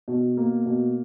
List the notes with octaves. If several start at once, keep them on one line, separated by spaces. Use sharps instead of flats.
B2
A#3
B2